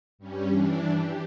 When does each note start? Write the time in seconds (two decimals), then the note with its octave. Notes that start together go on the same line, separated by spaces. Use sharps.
0.19 G2 G3 C#4
0.49 E3 D4
0.92 G4